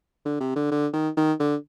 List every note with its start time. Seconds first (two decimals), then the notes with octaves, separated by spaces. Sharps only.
0.25 D3
0.40 C3
0.56 D3
0.71 D3
0.93 D#3
1.17 D#3
1.40 D3